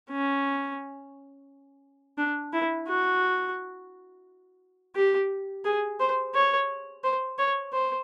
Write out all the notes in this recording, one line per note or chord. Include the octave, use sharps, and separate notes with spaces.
C#4
D4
E4
F#4
G4
G#4
C5
C#5
C5
C#5
C5